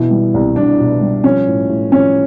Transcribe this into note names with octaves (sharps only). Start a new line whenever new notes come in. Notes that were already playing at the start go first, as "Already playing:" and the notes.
Already playing: B2 E3 E4
G3
C2
C2 D4
B2
G3
F3 C#4
A2
A2
F3 C#4